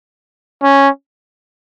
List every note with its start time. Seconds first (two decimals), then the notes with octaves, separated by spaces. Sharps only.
0.63 C#4